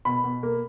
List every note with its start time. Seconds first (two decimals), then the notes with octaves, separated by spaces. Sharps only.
0.05 B2 B5
0.24 B2
0.43 A#3